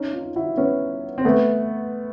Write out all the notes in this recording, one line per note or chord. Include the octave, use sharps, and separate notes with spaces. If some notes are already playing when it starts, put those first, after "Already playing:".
Already playing: C#4 D#4
D#4 F4
E4 F#4
B3 C#4
C4
A3 B3